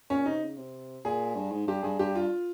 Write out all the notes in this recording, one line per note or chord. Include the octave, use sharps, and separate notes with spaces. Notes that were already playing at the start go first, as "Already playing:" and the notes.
A#2 C#4
C3 D#4
C#3
C3
A#2 G#4
G2
G#2
G2 G4
G2 G#4
G2 G4
F4